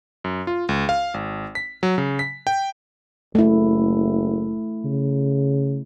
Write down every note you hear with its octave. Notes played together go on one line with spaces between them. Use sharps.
F#2
F4
C#2
F5
G#1
B6
F#3
C#3
B6
G5
F#1 A3 E4
C#3